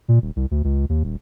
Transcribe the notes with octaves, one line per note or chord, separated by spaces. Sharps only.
A#2
D#1
C2
D2
C#2
D#2
D#1